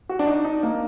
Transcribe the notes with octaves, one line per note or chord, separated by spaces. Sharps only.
F#4
D4
D#4
D#4
A#3